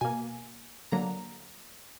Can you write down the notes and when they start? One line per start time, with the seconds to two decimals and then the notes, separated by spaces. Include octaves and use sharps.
0.01 B2 A#3 G#5
0.92 D3 F#3 A#3 A#5